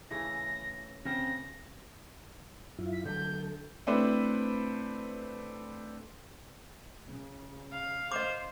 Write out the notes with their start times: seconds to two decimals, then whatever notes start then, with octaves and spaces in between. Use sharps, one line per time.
0.11 C#3 E3 A3 A#6
1.05 C#3 C4 A#6
2.79 F#2 E4 F4
2.93 B6
3.05 D3 F#3 A4 G6
3.87 A3 C4 D4 E4 B4 C5
7.08 C#3
7.72 F5
8.12 C5 D#5 D6